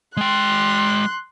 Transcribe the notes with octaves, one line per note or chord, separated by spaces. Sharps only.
G#3 G5 C6 F#6